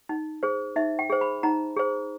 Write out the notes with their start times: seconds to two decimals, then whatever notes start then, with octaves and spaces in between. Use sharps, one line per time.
0.09 D#4
0.43 G#4 C5
0.76 D#4 E5
0.99 G5
1.10 G#4 C5
1.21 B5
1.43 D#4 A#5
1.77 G#4 C5